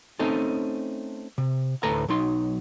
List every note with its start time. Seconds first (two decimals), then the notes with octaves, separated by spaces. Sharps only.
0.19 A3 C4 C#4 D#4 A4
1.38 C3
1.83 D2 A2 A4 B4 G#5 A#5
2.08 B1 F#3 D#4 C6